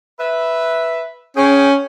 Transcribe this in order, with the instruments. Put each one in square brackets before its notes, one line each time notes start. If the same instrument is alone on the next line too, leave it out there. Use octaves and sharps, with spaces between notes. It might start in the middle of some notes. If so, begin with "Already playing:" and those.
[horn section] B4 E5
[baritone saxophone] C#4 [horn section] G#4 G5